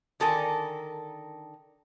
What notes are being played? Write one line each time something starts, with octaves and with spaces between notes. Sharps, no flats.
D3 D#3 A4 A#4 G#5